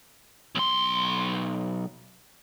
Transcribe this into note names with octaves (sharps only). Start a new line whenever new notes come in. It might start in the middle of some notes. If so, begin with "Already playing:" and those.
B1 C6